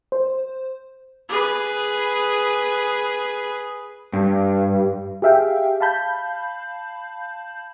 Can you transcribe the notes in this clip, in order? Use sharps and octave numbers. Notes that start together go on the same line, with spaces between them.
C5
G#4 B4
G2
G4 G#4 E5 F5 G5
F5 A5 B5 G6